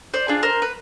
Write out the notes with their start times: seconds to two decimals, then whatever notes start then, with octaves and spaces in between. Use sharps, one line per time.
0.14 C5 D5
0.28 D4 F4 G#4
0.43 A#4 C5
0.62 B4